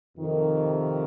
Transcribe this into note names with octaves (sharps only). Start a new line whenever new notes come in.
F2 C3 D#3